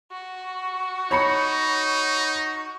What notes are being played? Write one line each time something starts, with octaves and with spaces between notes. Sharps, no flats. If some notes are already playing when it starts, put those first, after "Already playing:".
F#4
D#4 C#5 B5 C#7